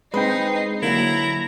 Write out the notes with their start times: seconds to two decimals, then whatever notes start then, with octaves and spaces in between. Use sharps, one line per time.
0.14 G#3 C4 D#4 B4 G5 C7
0.83 D3 F#3 A#3 E4 A#5